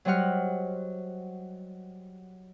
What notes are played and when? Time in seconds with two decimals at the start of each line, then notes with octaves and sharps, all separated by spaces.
0.05 F#3 G3 C5 D#5 F#5 F6